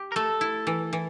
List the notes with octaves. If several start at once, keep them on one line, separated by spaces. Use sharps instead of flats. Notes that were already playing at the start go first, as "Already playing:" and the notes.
Already playing: G4
A#4
A3 A4
E4
E3
E3